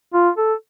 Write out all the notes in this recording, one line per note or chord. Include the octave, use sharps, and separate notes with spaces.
F4
A4